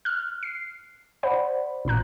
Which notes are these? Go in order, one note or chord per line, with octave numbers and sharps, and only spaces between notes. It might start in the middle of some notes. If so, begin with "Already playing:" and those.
F6 F#6
C7
C5 D5 F#5 B5
A1 A#2 A#5 F#6